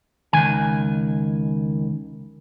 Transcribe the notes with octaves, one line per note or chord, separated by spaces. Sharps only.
C#2 D#3 F3 G#5